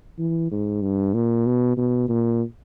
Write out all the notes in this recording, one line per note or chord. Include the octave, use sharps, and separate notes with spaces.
E3
G#2
G2
A#2
B2
B2
A#2